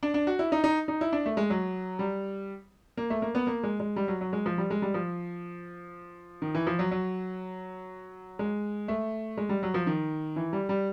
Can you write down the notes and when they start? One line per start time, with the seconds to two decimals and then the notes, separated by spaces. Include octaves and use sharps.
0.03 D4
0.14 D4
0.27 F#4
0.39 E4
0.52 D#4
0.64 D#4
0.88 D#4
1.01 E4
1.13 D4
1.26 A3
1.37 G#3
1.50 F#3
1.99 G3
2.97 A#3
3.10 A3
3.22 A#3
3.35 B3
3.47 A#3
3.63 G#3
3.80 G#3
3.96 G3
4.08 F#3
4.21 F#3
4.33 G#3
4.46 F3
4.58 G3
4.70 G#3
4.82 G3
4.94 F3
6.42 D#3
6.55 E3
6.67 F3
6.79 F#3
6.91 F#3
8.39 G#3
8.88 A3
9.37 G#3
9.49 G3
9.63 F#3
9.74 F3
9.87 D#3
10.36 E3
10.53 G3
10.69 G3